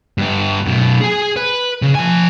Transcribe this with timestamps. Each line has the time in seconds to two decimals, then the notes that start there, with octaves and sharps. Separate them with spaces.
0.18 G2 B3
0.66 F#2 B2
1.01 G#4 G#5
1.36 B4
1.82 C#3
1.95 F3 G#5